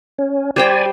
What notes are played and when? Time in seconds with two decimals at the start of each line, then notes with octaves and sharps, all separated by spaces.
0.19 C#4
0.56 G3 G4 C5 D5 G5 G#5